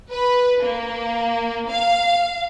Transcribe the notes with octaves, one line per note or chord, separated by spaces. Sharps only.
B4
A#3
F5